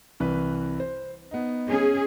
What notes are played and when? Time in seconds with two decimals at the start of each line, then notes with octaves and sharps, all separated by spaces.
0.20 C2 E3 B4
0.80 C5
1.31 B3 D#4
1.68 C#4 G#4